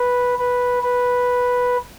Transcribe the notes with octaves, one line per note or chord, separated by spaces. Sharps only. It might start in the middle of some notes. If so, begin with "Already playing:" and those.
Already playing: B4
B4
B4